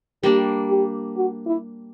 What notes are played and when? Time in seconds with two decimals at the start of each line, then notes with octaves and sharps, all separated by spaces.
0.23 G3 A#3 D4 G4
0.70 G4
1.16 F#4
1.46 E4